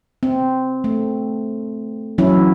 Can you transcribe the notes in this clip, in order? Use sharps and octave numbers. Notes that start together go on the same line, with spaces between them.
C4
A3
E3 F#3 C#4 E4